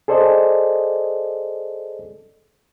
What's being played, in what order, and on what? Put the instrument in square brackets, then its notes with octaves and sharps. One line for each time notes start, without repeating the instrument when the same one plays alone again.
[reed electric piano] G#4 A4 C5 D5 D#5